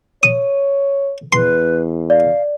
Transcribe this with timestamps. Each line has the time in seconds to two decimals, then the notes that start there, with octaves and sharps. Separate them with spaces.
0.23 C#5 D#6
1.33 E2 B4 C6
2.10 D5 F5